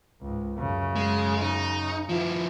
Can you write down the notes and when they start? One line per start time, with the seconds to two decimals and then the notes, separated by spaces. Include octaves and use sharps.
0.21 C#2 G#2
0.58 F#2 C#3
0.96 G#3
1.41 D#4
2.09 F3 E4